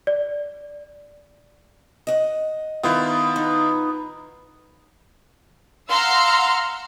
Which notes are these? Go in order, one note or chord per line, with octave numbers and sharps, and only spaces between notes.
D5
D#5 F#5
D#3 B3 E4 F4
D#4
F5 F#5 A#5 C6 E6 F6